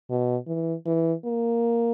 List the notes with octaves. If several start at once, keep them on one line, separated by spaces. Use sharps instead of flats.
B2
E3
E3
A#3